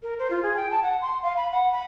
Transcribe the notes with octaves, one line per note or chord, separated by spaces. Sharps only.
A#4
C5
F4
G#4
G5
A5
F#5
C6
F5
B5
F#5
B5